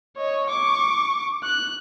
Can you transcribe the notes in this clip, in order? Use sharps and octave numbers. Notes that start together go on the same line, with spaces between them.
C#5 D#5
C#6 D6
F#6